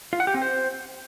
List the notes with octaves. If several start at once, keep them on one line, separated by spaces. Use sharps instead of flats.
F4
F#5
G4
C4
C5